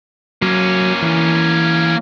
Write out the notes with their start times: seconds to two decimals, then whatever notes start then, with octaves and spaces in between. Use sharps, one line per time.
0.42 F#3 A#3 C#4
1.02 E3